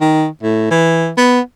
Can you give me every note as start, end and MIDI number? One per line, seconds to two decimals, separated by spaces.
0.01 0.27 51
0.43 0.68 45
0.71 1.12 52
1.18 1.40 59